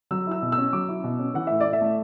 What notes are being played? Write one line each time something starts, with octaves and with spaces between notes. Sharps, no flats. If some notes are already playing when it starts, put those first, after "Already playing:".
F#3 E6
E4 E6
B2
E6
C#4
F#3 D6
E4
B2
C#4
E3 F#5
A2 E5
A2 D5
E5
A3